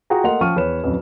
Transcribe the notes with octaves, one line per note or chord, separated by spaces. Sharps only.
F4 F#4 G#4 G5 A#5
A3 A#3 D#5 F#5 C6 F7
F3 C#4 G5 C#6 F6 D#7
E2 B4 C#5 E7
D1 F2 C#4 B4